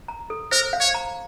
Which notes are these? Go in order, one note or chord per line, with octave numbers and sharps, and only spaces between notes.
A#5
A4
A#4 C5
F5
C#5
A#5